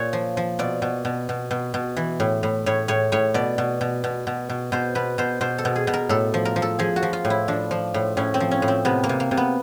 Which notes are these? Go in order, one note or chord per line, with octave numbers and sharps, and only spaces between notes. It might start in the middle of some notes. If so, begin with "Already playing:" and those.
Already playing: A#2 C#5
F3
F3
B2 D5
B2
B2
B2
B2
B2
E3
A2
A2
A2 C#5
A2 C#5
A2 C#5
B2 D5
B2
B2
B2
B2
B2
B2 C5
B2 B4
B2 C5
B2 C5
A4
B2
G#4
B2
A#4
A2 A4
F3
A#4
F3
A4
F3 G#4
F#4
F3
F4
A2
E4
F3 D4
F3
A2
A2 C#4
C4
F3
C#4
A2
C4
C3 B3
A#3
C3
A#3
C3
B3